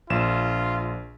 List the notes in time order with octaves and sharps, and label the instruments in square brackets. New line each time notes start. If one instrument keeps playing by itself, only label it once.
[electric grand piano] A#1 E7 [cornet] F4